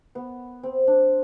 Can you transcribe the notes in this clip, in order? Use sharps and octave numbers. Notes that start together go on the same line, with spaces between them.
B3
C4
D4